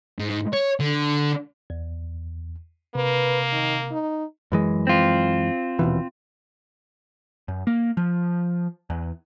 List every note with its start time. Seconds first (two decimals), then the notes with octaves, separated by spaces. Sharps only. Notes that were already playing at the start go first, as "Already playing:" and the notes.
0.19 G#2
0.54 C#5
0.80 D3
1.70 E2
2.95 C3 A#3 B4
3.52 D#3
3.91 D#4
4.52 F#2 E3 G#3
4.87 C4 F4
5.79 D#1 B2 E3
7.48 F#2
7.67 A#3
7.97 F3
8.90 E2